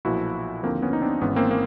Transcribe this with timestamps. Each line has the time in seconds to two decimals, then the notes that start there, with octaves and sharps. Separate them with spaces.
0.05 B1 A#2 F3 E4 F#4
0.63 D#2 D3 F3 A#3 C4
0.82 B3 C#4
0.93 D#4
1.02 C4 D4
1.21 G#1 G#2 E3 B3 C#4
1.36 A#3 C4
1.51 A#3